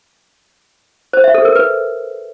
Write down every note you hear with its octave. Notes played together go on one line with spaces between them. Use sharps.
C5
E5
A4
A#4
B4